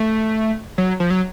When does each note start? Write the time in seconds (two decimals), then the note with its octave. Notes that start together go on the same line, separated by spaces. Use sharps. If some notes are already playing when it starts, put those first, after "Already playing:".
Already playing: A3
0.78 F#3
1.00 F3
1.10 F#3